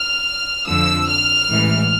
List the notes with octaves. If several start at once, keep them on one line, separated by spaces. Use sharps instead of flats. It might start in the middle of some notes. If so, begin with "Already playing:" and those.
Already playing: F6
F2 D3 F3 E6
F6
A1 G#2 E3